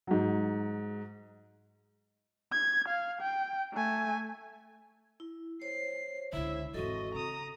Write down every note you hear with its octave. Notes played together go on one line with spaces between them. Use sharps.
G#2 F#3
G#6
F5
G5
A3 G#5
E4
C5 C#5 C7
C#2 D3 E4 E5
G#1 E2 C4 F#4 A4 D#5
C#3 A#5 D#6